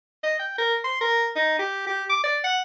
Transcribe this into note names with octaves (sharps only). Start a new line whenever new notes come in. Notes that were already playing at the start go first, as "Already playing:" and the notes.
D#5
G5
A#4
C6
A#4
D#4
G4
G4
D6
D5
F#5